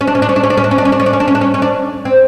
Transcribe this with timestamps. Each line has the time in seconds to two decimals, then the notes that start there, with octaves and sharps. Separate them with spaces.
0.01 C#4
0.07 D4
0.15 C#4
0.22 D4
0.29 C#4
0.36 D4
0.43 C#4
0.50 D4
0.57 C#4
0.64 D4
0.71 C#4
0.78 D4
0.85 C#4
0.92 D4
1.00 C#4
1.06 D4
1.13 C#4
1.20 D4
1.28 C#4
1.35 D4
1.41 C#4
1.54 C#4
1.62 D4
2.05 C4